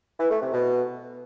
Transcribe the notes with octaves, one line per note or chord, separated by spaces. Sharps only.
E3
A3
C3
B2